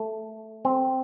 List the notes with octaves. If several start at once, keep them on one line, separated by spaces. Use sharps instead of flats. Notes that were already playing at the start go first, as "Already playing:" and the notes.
Already playing: A3
C4